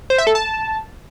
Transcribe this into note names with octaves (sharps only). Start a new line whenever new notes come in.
C5
E5
A4
A5